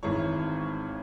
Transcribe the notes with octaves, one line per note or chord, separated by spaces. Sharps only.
G#1 G#2 E3 C#5